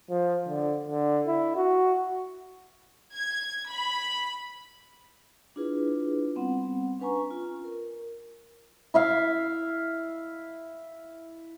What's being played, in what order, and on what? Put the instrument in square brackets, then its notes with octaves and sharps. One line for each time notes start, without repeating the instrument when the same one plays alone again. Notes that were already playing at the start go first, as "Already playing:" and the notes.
[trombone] F3
D3
D3
E4
F#4
[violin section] G#6
B5
[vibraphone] D4 E4 F4 G#4 B4
G3 B3 C4 F#5
C#4 D4 B4 G#5 A#5 C#6
F4
A#4
[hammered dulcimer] E4 E5 F5